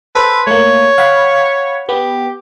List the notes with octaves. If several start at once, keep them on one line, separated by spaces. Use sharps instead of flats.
A4 B4 C5
A3 A#3 C#5
F5 F#5 B5
B3 G4